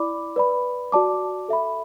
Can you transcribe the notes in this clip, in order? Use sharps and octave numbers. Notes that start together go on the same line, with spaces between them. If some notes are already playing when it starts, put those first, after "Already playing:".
Already playing: E4 D5 B5 D6
B4 D5 B5
F#4 D5 A5 D6
A4 E5 B5